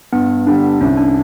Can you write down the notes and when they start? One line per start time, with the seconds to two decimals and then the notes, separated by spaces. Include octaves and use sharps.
0.13 G2 B3
0.47 D3 G3
0.81 C2 C#4
0.97 D4